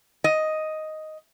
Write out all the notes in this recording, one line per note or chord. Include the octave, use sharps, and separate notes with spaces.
D#5